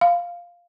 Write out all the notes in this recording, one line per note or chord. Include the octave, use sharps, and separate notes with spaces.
F5